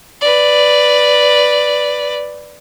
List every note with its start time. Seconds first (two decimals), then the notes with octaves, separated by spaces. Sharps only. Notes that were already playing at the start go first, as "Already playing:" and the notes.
0.21 B4 D5